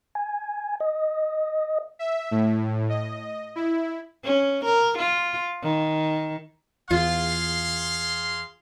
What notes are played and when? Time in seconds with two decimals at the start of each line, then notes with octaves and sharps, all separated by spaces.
0.15 G#5
0.80 D#5
1.99 E5
2.31 A2
2.89 D#5
3.56 E4
4.24 C#4
4.65 A#4
4.99 F4
5.63 D#3
6.91 E2 F4 G#4 F5 C6